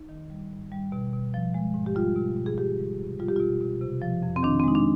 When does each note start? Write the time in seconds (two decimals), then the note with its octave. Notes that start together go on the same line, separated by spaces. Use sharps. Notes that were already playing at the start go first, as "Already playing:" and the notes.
Already playing: D#4
0.09 D#3
0.30 G3
0.51 G#2
0.72 G3
0.92 B2
1.13 B2
1.34 F3
1.54 G#3
1.74 G#2
1.86 G4
1.95 G3 F4
2.16 B2
2.37 B2
2.46 G#4
2.58 D#3 G4
2.78 G3
2.99 C3
3.19 G3 F4
3.28 G4
3.36 B2 F4
3.61 B2
3.81 C3
4.02 F3
4.23 F2
4.36 C4
4.43 D#3 D4
4.60 C4
4.64 G#3 D#4
4.75 D4